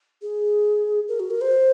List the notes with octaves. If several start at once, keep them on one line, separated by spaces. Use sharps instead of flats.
G#4
A#4
F#4
A#4
C5